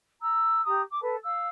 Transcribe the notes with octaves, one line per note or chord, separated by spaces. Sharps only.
A#5 E6
G4 A#5 D#6
D6
A4 B4 A5
F5 E6